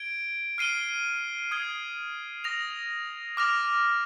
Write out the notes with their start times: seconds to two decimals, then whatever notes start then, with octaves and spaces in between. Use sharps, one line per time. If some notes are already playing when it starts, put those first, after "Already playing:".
Already playing: G#6 D7 G7
0.58 F6 C7 D#7 G7
1.51 D#6 G#6 C7 G7
2.44 D#6 A#6 F7
3.37 D6 F6 A#6 F7